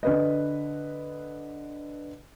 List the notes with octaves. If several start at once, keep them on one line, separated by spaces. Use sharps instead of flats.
D3 B4 D#5